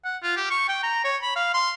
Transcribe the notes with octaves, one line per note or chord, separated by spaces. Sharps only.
F#5
F4
G4
C#6
G5
A#5
C#5
B5
F5
C6